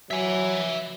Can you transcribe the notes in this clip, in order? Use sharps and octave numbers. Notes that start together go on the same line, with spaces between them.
F#3 E5 G#5